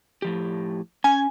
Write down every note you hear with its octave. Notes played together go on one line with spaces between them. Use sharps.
A2 F3 G4
C#4 G#5